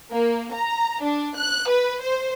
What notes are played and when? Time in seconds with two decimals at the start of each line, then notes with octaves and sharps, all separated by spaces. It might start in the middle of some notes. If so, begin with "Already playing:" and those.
0.11 A#3
0.53 A#5
1.02 D4
1.36 F#6
1.68 B4
2.01 C5